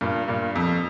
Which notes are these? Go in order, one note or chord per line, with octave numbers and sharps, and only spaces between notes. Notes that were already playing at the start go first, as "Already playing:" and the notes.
G2 A#2
G2 A#2
F2